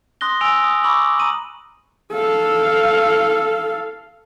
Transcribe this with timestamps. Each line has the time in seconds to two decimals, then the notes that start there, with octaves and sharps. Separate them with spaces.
0.21 C6 D#6 F#6 A#6 G7
0.41 G#5 E6 D7 F7
0.64 D#6
0.84 B5 C#6 D6 E6 F#7
1.19 A#5 D#6 D#7 F#7
2.13 A4 F5